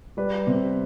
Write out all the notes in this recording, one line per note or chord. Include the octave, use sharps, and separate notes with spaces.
G3 B4 D5
C3